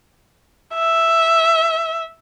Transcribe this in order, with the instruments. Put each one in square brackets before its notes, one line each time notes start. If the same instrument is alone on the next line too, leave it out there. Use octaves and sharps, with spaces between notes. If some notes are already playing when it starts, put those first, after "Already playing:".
[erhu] E5